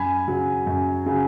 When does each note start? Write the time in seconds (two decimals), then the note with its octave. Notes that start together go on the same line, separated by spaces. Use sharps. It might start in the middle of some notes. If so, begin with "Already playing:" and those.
Already playing: F#2 G#5 B5
0.28 C#3 F#3
0.67 F#2
1.06 C#3 F#3